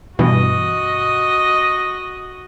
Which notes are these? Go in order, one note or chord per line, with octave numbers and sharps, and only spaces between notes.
G2 B2 E3 F#4 D#5